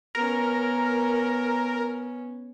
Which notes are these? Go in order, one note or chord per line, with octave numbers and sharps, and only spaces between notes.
B3 C#4 A#4